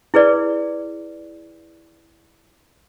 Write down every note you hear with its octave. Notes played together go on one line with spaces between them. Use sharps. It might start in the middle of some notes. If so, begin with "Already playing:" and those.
E4 G#4 B4 D5